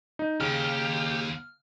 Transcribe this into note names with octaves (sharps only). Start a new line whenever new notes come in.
D#4
D#2 C#3 G4 F6